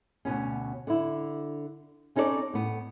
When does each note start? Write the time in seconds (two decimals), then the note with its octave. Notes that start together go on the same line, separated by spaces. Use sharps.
0.25 D2 B2 B3 C#4
0.87 D3 E4
2.16 C4 C#4 D#4 A4 A#4 D5
2.54 A2 B3